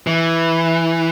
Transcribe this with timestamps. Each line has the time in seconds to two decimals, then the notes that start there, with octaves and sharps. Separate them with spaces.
0.07 E3